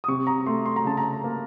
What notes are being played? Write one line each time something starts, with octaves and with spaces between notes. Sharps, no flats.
D#6
C3 C#6
A#5
A3 C6
C6
A#5
C#3 A5
A#5
A#3